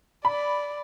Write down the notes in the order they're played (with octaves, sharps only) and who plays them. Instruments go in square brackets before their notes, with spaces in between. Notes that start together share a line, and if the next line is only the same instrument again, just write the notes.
[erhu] D5 [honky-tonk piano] B5